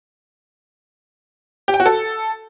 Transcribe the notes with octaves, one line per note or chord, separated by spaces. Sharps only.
G4
G5
F#4
A4